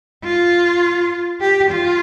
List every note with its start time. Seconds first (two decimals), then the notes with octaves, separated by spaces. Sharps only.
0.24 F4
1.40 G4
1.71 F4